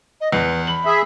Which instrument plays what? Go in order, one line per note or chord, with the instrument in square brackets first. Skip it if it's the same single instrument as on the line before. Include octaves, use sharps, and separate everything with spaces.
[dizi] D#5
[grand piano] E2 [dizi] B4
[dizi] B5 [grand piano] F#7
[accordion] G#4 E5